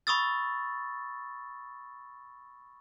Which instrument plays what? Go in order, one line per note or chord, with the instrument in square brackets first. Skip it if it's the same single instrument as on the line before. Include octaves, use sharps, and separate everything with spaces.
[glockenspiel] B5 C#6 D#6 E6 A6